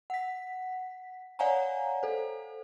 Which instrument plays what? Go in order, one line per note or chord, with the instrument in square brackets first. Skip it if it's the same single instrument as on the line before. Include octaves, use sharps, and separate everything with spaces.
[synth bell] F#5 B6
C#5 D5 F5 F#5 G#5 A#5
A4 C5